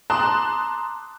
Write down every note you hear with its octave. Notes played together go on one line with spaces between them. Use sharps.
A5 A#5 C6 D6 D#6 F#6